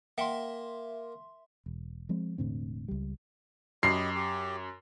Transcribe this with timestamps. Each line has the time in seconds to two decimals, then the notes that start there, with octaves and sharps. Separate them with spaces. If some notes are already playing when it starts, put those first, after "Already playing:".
0.18 A#3 E5 F#5 G5 C6 G7
1.66 E1
2.09 F3 G#3 C4
2.38 E1 A2 D3 C4
2.88 C#2 G3
3.83 F#2 G4 D#5 B5 C7
4.15 G4